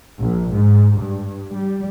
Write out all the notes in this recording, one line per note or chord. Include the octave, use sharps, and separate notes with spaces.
A#1
G#2
G2
G3